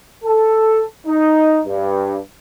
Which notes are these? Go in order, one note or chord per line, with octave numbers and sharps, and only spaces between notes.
A4
D#4
G2